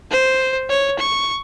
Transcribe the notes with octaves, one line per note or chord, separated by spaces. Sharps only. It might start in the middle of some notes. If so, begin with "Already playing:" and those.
C5
C#5
C#6